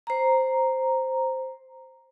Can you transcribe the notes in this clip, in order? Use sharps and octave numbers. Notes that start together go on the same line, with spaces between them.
C5 A#5